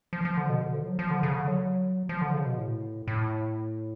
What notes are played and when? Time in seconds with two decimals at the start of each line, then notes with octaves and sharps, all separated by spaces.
0.13 F3
0.25 F3
0.37 D3
0.50 B2
0.62 D3
0.74 F3
0.87 F#3
0.99 F3
1.11 D3
1.23 C#3
1.36 D3
1.48 F#3
2.09 F3
2.22 D3
2.34 C#3
2.46 B2
2.58 A2
3.08 A2